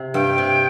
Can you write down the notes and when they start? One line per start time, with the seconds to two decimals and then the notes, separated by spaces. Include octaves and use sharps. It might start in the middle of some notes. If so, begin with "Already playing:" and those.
Already playing: C3
0.14 G2 G5
0.38 C3